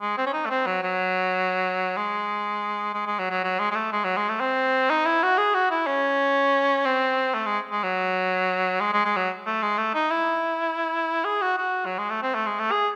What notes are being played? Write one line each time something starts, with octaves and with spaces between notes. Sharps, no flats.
G#3
C4
C#4
D#4
A3
C4
F#3
F#3
G#3
G#3
G#3
F#3
F#3
F#3
G#3
G#3
A3
G#3
F#3
G#3
A3
C4
D#4
E4
F#4
G#4
F#4
E4
C#4
C4
A3
G#3
G#3
F#3
G#3
G#3
G#3
F#3
A3
G#3
A3
D#4
E4
G#4
F#4
F#4
F#3
G#3
A3
C4
A3
G#3
A3
G#4